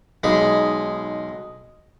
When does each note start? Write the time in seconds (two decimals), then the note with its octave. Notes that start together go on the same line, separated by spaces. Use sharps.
0.24 B1 G#3 D#4 G#4 B5